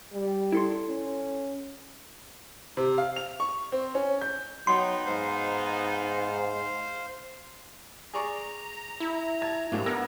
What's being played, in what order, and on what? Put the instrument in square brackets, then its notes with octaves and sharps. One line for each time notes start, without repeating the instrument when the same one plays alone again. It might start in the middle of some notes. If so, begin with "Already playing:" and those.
[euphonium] G3
[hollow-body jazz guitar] E4 A4 C6
[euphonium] C#4
[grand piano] C3
F5
F7
C#6
C4
C#4
G6
[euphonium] F#3 [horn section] B3 D#4 [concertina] G5 [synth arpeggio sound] C6
[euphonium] G#2 [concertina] C5 F5
[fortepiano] G#4 D5 C#6 [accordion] A#5
[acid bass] E4
[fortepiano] A5 [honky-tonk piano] G#6
[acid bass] G#2 [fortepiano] F#3 D4 G4 [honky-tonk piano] A#3
[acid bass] B3 [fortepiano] A#4 [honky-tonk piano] E6 G#6 A#6